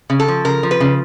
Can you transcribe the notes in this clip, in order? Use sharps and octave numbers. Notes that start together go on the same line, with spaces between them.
C#3
A4
F3
C#3 A#4
F3
B4
C#3